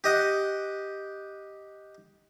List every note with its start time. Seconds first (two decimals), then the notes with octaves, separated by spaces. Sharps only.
0.04 G4 D#5 F#5